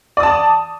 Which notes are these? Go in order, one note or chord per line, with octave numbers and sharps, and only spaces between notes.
D5 A5 D#6